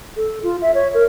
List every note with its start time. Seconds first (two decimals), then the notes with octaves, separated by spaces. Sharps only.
0.16 A4
0.43 F4
0.62 E5
0.75 C#5
0.94 A#4